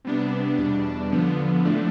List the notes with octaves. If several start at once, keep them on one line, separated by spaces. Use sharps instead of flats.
C3 G3 B3 D4
E2 B2 G3 D4
D3 F3 B3
A2 F3 A3 D4